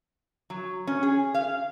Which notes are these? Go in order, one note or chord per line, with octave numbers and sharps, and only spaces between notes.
F#3
C#4
G#4
F5